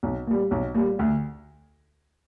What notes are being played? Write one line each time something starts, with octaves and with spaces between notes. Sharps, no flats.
B1
A#2 G3
B1
A#2 G3
D2